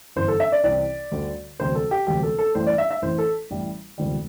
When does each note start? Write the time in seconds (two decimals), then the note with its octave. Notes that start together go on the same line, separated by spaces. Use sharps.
0.16 G1 G2 E3 C5
0.28 A4
0.40 E5
0.52 D5
0.64 C2 C3 E3 D5
1.12 D2 D3 G3
1.59 E1 D2 C3 G3 C5
1.75 A4
1.91 G4
2.07 E1 D2 C3 G3 G4
2.23 A4
2.39 A4
2.55 A1 A2 E3 G3 C5
2.67 D5
2.78 E5
2.91 E5
3.02 A1 A2 E3 C5
3.18 A4
3.50 A1 A2 E3 G3
3.98 E1 D2 C3 E3 G3